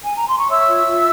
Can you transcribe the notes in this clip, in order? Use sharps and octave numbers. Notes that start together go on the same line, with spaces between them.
G#5
A#5
C6
C#6
C#5 E5 E6
F4
F4